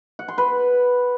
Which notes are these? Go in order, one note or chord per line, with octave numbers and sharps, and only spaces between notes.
F#5
C6
B4